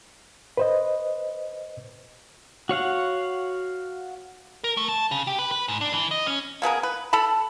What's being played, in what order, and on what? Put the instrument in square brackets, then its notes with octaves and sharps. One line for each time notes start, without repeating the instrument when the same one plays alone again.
[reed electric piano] B4 C5 D#5
[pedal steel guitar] F#4 C#5 F5 F#5
[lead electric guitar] A#4
A3
A5
C#3
G4
B4
B4
G#2
D4
E3
D#5
C#4
[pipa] A#3 B3 G#4 A#4
B4
A4 A5 B5